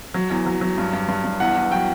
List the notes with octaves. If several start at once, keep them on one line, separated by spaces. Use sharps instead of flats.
F#3
E2
F#3
F#3
G2
G2
G2
G2
E2 F#5
E2
F#3 G5